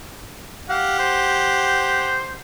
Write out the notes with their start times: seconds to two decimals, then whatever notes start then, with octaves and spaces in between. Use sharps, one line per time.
0.70 G4 F5 F#5
0.99 C5